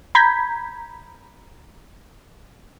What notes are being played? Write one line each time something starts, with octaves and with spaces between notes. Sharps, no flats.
A#5 B5 G6 G#6 B6